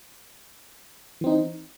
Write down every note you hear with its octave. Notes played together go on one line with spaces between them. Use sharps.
E3 C4 D#4